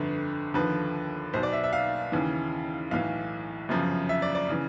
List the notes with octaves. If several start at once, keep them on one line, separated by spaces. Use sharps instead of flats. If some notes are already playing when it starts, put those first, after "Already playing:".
Already playing: G1 F2 D3 B4
D#2 D3 F3 B4
B1 B2 C5
D5
E5
E5
F5
D#2 C#3 E3
B1 A2 E3 F5
G1 F#2 C#3 F3
E5
D5
D5
C#3 E3